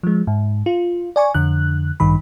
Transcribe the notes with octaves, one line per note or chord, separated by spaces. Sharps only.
F3 G#3
G#2
F4
D5 G#5 C#6
F2 D3 F#6
A1 G2 D#3 B5